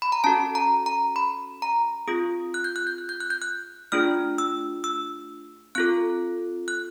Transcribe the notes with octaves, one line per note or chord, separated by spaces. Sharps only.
B5
A#5
C#4 F#4 A4 A5
A#5
A#5
B5
A#5
C4 F4 G#4 D#6
F#6
G6
F#6
G6
F#6
G6
F#6
G6
F#6
A3 D4 F4 G#4 F6
E6
E6
C4 F4 A4 F#6
F#6